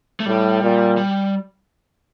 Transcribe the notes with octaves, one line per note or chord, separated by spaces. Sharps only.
A3
A2 G3
A#2
G3